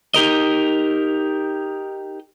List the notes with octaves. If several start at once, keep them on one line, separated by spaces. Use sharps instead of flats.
D#4 G4 A#4 D#5